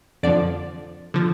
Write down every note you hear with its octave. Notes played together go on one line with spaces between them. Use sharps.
F2 D3 F3 D5
D3 F3